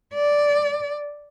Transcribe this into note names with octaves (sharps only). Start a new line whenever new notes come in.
D5